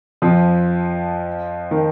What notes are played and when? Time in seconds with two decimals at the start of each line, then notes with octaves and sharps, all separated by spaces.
0.22 F2 F3
1.71 D#3